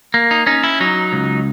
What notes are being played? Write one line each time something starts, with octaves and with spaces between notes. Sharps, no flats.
A#3
D#4
C#4 D#4
E4
F#3 D#4
C#2